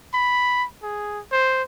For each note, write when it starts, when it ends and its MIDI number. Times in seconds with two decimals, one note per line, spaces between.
0.14 0.66 83
0.83 1.20 68
1.32 1.63 72